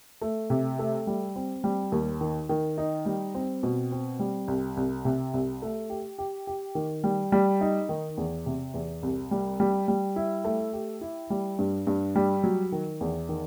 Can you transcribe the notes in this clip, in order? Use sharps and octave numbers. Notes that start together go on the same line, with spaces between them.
A3
C3
A3
G3
C4
G3
D#2
D#3
D#3
D#4
G3
C4
B2
C4
G3
C2
C2
C3
C2
A3
G4
G4
G4
D#3
G3
G3
D#4
D#3
E2
C3
E2
C2
G3
G3
G3
E4
A3
G4
E4
G3
G2
G2
G3
F#3
D#3
E2
D#3